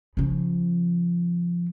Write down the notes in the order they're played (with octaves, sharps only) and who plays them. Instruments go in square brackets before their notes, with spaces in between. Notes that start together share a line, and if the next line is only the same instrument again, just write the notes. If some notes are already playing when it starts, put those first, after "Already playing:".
[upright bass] C#3 F3